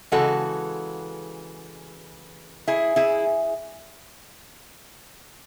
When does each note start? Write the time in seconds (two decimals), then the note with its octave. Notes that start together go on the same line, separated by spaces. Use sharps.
0.12 C#3 E3 G#3 F#4 A4
2.68 E4 G#4
2.96 E4 G#4